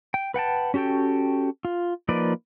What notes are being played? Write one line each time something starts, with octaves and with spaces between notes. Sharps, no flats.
G5
B4 F#5 G5 A5
C#4 F#4 G4 A4 G5
F4
F3 A#3 D#4 B4 D5